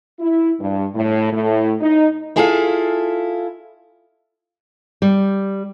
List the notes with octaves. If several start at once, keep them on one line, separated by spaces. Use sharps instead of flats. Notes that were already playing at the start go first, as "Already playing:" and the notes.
E4
G2
A2
A2
D#4
E4 F4 G#4 A4 D5 F5
G3